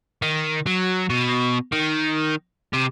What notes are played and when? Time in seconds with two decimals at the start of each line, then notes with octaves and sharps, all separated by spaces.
0.22 D#3
0.66 F#3
1.10 B2
1.72 D#3
2.73 C3